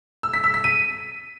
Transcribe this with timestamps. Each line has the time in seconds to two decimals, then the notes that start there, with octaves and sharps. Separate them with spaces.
0.23 E6
0.34 B6
0.44 E6
0.54 B6
0.64 D#7